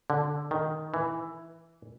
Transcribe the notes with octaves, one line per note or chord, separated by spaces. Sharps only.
D3
D#3
E3